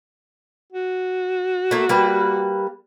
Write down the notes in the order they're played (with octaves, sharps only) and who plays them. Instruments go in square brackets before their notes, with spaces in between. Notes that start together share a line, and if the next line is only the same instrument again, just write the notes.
[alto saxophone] F#4
[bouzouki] A3 A#3 E5
G3 A#3 B4